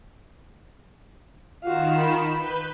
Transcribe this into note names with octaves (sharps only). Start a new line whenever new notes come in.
D#3 F4 F#4 F5 E7
B5
B4 G6